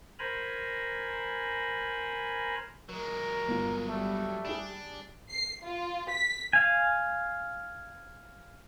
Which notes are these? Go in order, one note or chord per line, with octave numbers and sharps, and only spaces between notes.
A#4 C5 G#5 A#5 B5
F#3 G#3 A#4
G1 F4
G3 A3
D4 G#4 E7
C7
F4
B6
F5 G#5